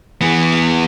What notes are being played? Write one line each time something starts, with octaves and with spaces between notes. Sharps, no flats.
E3 B3